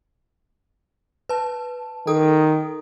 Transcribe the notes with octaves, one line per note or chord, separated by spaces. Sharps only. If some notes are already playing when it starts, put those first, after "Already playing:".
B4 A5
D#3 A4 D#6